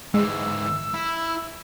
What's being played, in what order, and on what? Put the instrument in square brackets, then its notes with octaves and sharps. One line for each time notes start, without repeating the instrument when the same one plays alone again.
[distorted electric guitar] G#2 E3 [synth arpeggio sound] G#3 [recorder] E6
[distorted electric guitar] E4